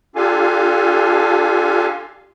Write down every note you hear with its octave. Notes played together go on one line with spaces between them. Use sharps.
D4 F4 G4 A4 F5 G#5